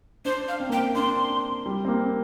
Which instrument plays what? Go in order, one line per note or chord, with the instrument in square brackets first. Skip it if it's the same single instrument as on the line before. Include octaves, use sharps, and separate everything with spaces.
[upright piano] D4 [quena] C5
[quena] F5
[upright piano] C4
[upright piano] A#3 [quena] G5
[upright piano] C4
[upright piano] D4 [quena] C6
[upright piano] G3
C4
A#3